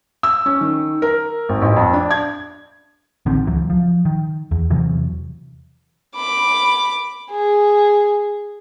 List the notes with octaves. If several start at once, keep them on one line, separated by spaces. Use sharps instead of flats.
E6
C#4
D#3
A#4
G#1
A1
F2
D4
G#6
A1 D3 D#3 C4
C#2 E3 F#3
F3
D#3
E2
E2 C3 E3 F#3
B5 D6
G#4